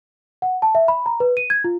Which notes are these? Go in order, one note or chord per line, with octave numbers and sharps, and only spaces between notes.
F#5
A5
E5
B5
A#5
B4
D#7
G#6
F4